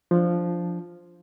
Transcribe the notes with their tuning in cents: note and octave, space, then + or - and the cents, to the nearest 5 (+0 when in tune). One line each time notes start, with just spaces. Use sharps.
F3 +0 D4 +0